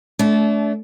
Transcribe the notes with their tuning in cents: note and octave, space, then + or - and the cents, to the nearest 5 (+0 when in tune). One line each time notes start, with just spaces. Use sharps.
A3 -25 D4 -35